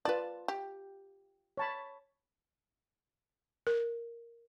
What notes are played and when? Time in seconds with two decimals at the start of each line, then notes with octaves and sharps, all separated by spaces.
0.05 F4 B4 D5 A5
0.48 G4
1.57 C#5 A5 B5
3.67 A#4